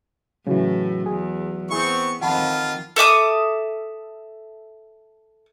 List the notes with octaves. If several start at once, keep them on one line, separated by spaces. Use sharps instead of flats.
A2 C#3 E3 F#3 A3 F#4
E2 G#4
B3 C4 E4 G#4 C#6
F2 D#3 F3 F4 F#5 A5 B5
A4 E5 D6 D#6